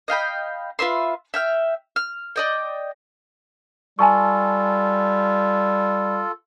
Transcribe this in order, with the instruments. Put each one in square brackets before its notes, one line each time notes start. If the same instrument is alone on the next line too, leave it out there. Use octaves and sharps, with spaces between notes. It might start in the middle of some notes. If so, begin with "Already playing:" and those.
[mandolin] D#5 F5 G5 B5
F4 B4 E5 C6
E5 G5 F6
F6
D5 D#5 G5
[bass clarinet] G3 [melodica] F4 A4 [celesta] G#5 A5 C#6